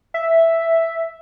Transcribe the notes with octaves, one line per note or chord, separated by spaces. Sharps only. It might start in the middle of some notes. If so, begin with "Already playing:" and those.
E5